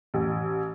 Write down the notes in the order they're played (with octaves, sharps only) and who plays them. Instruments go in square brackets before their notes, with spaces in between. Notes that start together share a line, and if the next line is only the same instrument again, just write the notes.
[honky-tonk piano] A1